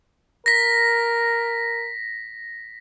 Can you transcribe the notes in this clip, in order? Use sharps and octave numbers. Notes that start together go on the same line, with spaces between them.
A#4 A#6 B6